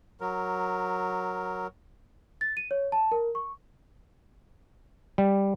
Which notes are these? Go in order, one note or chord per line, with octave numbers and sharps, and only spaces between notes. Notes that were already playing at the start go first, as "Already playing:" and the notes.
F#3 A#4
A6
D#7
C#5
A5
A#4
C#6
G3